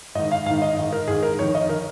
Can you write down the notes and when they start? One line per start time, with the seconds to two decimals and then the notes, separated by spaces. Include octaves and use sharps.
0.15 G#2 D#5
0.19 D#3
0.31 F5
0.46 G#2 D#3 F5
0.62 D#5
0.77 G#2 D#3 D#5
0.93 A#4
1.08 G#2 D#3 G#4
1.23 A#4
1.39 F2 C#5
1.42 D#3
1.55 D#5
1.69 D#3 A#4